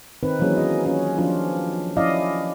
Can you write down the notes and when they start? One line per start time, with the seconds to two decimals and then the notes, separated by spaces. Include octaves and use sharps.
0.23 D#3 C4 D#4 B4
0.40 E3 F#3 A#3 C#4 G#4
0.57 G#4 D#5
0.86 C#4 F4
1.18 F3 C#4 D4 F4
1.97 F3 C#4 E4 D5 D#5 F5